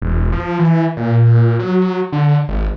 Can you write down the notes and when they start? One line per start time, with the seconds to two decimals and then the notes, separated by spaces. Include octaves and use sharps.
0.02 E1
0.32 F3
0.59 E3
0.97 A#2
1.59 F#3
2.12 D3
2.48 G#1